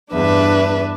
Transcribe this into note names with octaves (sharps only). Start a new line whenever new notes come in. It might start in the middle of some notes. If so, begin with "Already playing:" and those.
E2 G2 D4 B4 E5